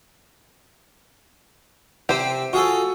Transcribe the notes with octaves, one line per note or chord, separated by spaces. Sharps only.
C3 C4 G4 C5
F4 F#4 G#4 A4